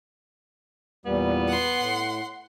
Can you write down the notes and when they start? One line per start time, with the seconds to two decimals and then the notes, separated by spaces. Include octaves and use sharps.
1.06 E2 A#2 G3 B3
1.48 F#5 C6
1.79 A2